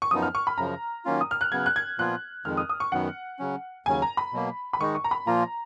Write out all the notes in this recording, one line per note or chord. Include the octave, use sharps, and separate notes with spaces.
C#6
F#2 F3 B3 D#4 D#6
F6
C#6
B5
F#2 C#3 F3 A#5
D#3 F#3 A#3 C#4 F4
D#6
F6
F#6
C#3 F#3 B3 G#6
F#6
G#6
A#2 F3 B3 F4 F#6
F2 D#3 G#3 F6
D#6
D#6
C#6
F#2 D#3 F#3 B3 F#5
C#3 F#3 C#4
D#2 C#3 F#3 C#4 G#5
A#5
B5
B2 F#3 A#3
B5
D#3 G#3 D#4 C#6
C#6
A#5
B5
A#2 F3 A#3 F4 A#5